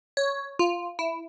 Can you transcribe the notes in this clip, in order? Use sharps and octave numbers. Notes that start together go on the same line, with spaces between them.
C#5
F4
E4